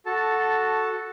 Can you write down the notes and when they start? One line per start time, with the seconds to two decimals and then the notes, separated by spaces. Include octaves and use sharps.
0.06 F#4 A4 A5